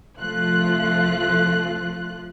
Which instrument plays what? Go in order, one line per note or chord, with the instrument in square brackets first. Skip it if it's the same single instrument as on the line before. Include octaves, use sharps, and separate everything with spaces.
[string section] C2 F3 A3 F4 F#6